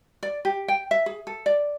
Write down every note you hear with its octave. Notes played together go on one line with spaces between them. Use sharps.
D5
G4
G5
E5
G#4
A4
D5